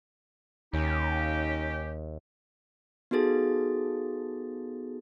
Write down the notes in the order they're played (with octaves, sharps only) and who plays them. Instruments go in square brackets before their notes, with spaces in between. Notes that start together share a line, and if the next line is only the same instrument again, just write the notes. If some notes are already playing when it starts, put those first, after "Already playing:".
[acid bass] D#2 [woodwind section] C#4 D#4 G4
[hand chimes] B3 D#4 F#4 G#4 A4 A6